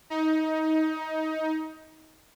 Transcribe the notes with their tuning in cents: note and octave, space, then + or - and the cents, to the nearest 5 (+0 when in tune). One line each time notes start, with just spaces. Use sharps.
D#4 +20